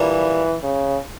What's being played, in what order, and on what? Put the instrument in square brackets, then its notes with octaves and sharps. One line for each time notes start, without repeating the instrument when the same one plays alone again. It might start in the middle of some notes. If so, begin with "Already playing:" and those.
Already playing: [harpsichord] A#2 G3 A#3 D4 [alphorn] E3
[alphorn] C#3